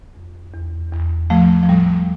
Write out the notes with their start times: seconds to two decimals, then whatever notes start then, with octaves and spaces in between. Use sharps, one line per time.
0.15 F2
0.54 E2
0.92 E2
1.30 A2 F3 A3
1.63 F3
1.69 A2 G3